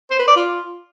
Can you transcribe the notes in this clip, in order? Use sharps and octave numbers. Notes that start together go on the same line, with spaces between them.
C5
B4
D5
F4